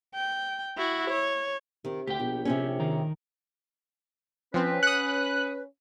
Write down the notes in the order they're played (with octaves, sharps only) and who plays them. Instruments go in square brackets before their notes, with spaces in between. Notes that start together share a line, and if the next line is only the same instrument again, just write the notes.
[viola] G5
E4 F#4
C#5
[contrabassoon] C3 [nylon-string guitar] D#3
[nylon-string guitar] D2 [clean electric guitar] G4 G5
[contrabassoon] A#1 [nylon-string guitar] B2
[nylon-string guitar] C3 C4 C#4
[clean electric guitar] D#3 A#4
[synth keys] F3 C4 [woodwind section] C#4 B4
[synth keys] F#5 D#6 [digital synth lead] F#6